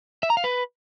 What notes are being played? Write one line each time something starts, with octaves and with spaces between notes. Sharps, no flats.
E5
A#5
F5
B4